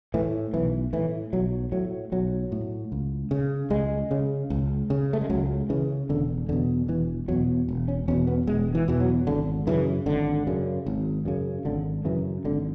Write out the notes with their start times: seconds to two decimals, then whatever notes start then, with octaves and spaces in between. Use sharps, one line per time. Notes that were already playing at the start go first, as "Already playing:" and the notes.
0.14 A2 E3
0.54 B1 E3
0.93 A2 E3
1.33 B1 F#3
1.72 A2 F#3
2.12 B1 F#3
2.52 A2
2.92 C#2
3.31 C#3
3.70 C#2 G#3
4.11 C#3
4.50 C#2
4.90 C#3
5.13 A3
5.21 G#3
5.30 C#2 F#3
5.69 C#3 E3
6.09 E1 D3
6.49 E2 B2 D3
6.88 E1 E3
7.28 E2 B2 F#3
7.68 E1
7.88 C#4
8.08 E2 B2 C#4
8.27 B3
8.47 E1 G#3
8.75 E3
8.88 E2 B2 E3
9.00 F#3
9.27 G#1 D3
9.67 F#2 C#3 E3
10.06 G#1 D3
10.47 F#2 C#3
10.86 G#1
11.25 F#2 C#3
11.65 G#1 D3
12.05 F#2 C#3 E3
12.44 G#1 D3